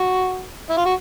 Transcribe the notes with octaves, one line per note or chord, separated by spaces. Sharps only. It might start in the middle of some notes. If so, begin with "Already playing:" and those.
Already playing: F#4
E4
F4
F#4